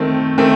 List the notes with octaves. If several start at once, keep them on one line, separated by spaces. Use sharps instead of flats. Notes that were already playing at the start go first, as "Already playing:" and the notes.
Already playing: D#3 A3 C4
D#3 A3 C4